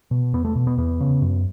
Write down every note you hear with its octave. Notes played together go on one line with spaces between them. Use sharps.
B2
E2 B3
A3
B2
B3
E2 B3
C#3
F#2